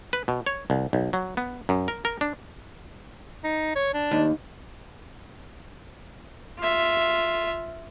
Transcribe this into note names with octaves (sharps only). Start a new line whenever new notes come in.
B4
B2
C#5
C2
B1
F#3
B3
F#2
A#4
A#4
D4
D#4
C#5
D4
D#2
F4 E5